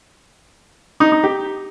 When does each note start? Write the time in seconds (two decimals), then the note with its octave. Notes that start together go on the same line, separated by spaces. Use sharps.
1.00 D#4
1.12 D#4
1.24 G4